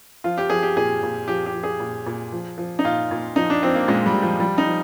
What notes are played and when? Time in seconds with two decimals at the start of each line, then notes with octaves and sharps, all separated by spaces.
0.24 F3 F4
0.38 G4
0.50 F3 G#4
0.63 G4
0.77 A#2 G#4
1.03 A#2
1.28 F3 G4
1.46 G4
1.54 F3
1.64 G#4
1.80 A#2
2.06 A#2
2.32 F3
2.58 F3
2.79 D#4
2.85 A#2 F4
3.11 A#2
3.36 F3 D#4
3.50 D4
3.62 F3 C4
3.75 A#3
3.88 A#2 G#3
4.06 G3
4.14 A#2
4.22 F3
4.40 F3 G3
4.58 D#4
4.66 F3